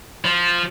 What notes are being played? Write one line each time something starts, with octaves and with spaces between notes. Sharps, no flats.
F3